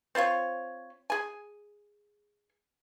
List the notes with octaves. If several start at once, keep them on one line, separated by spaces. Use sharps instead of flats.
C4 F4 C5 C#5
G#4 G#5